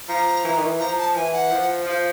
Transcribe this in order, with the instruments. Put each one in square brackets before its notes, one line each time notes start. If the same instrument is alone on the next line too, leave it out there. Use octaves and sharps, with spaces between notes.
[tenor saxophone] F3 [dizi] A#5
[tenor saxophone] E3
D#3
E3
[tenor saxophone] F3 [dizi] A#5
[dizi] A5
[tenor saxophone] E3 [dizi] G#5
[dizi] F#5
[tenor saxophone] F3
[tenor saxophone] F3 [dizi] F5